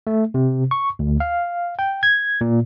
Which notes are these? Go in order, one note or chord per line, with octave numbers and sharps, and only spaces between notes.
A3
C3
C#6
D2
F5
G5
G#6
A#2